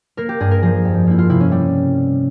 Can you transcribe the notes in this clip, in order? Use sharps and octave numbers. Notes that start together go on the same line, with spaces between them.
A#3 A#4
G4
G2 G#4
A#4
F3 G#4
F2
A#3 E4
F4
C3 E4
C#4
G3 E4